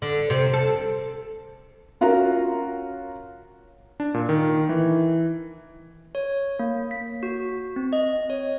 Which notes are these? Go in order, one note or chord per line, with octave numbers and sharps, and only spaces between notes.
D3
C3
A4
C#4 F4 F#4 A#4 A#5
D4
A#2
D#3
E3
C#5
A#3
B6
F#4
C4
D#5
C#5